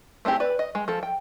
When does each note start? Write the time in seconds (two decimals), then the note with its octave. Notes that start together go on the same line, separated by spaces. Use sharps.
0.25 A3 C4 E4 G4 G#4
0.40 B4 D5
0.59 D#5
0.75 G#3
0.88 F3 A4
1.03 G5